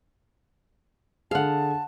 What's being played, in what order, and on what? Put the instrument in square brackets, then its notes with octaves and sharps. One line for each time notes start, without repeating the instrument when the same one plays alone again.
[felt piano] D3 G#4 [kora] F5 F#5 [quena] A5